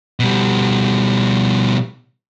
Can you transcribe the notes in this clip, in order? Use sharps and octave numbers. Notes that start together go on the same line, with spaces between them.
B2 G3